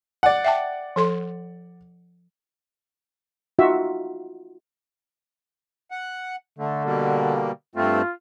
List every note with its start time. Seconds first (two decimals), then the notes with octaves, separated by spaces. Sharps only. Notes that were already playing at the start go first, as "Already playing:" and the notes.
0.23 D5 F#5
0.44 E5 G5 A5
0.96 F3 A4 C6
3.59 D#4 F4 F#4 E5
5.91 F#5
6.59 D3 A3
6.84 B2 G3 A#3
7.76 G2 A3 C4 F4